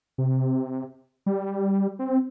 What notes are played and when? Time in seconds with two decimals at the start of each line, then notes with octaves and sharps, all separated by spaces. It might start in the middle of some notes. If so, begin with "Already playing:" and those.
0.18 C3
1.26 G3
1.99 C4